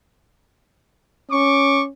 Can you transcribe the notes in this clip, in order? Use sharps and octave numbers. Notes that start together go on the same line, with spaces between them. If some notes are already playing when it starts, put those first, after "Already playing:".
C#4 C#6 D6